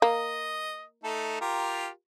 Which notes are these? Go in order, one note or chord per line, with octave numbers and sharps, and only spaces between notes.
A#3 D#5
A3 D#4 A4
F4 G4 A#4